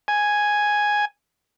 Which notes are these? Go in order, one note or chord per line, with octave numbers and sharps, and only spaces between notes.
G#5